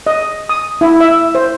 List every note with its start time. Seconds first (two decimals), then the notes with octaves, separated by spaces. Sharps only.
0.07 D#5
0.49 D#6
0.81 E4
1.01 E5
1.35 C5